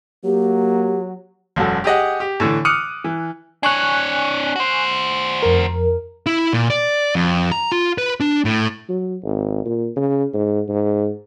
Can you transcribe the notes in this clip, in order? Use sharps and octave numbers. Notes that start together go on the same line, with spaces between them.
F#3 A#3 G4
E1 F#2 F#4 A4
G4 G#4 D#5 F#5
G4
A2 D3 E3
D6 D#6 F6 F#6 C#7
E3
D4 C#5 G#5 C#6 F#6
F#4 C5
F2 A#4
E4
A#2
D5
F2
A#5
F4
B4
D4
A2
F#3
G#1
A#2
C#3
G#2
G#2